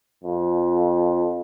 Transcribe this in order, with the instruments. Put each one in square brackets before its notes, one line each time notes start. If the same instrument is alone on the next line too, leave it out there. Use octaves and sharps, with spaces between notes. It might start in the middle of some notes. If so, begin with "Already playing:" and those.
[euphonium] F2